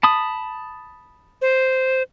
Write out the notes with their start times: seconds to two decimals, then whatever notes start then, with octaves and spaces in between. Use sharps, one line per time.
0.03 A5 B5 D#6
1.42 C5